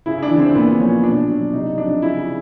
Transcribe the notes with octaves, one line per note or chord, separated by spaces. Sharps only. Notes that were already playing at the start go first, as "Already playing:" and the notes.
C#3 E4
D4
E3
C4
A#2 B3
F3 C#4
B2 D4
F#3
C3 D#4
F3 D4
C#3 E4